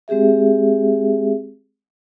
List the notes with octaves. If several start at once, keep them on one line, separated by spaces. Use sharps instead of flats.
G#3 C4 G4 G#4 E5